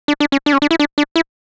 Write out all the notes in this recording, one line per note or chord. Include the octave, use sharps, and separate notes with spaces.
D4
D4
C#4
D4
C#4
D4
E4
D4
D4
E4